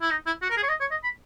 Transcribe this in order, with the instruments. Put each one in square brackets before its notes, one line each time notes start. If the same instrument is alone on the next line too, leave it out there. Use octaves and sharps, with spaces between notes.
[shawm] E4
D#4
E4
F#4
A#4
G#4
C#5
D#5
C#5
D#5
B5